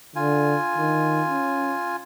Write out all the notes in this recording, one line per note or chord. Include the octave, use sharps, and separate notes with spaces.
D3 F4 G#5
D#3
C#4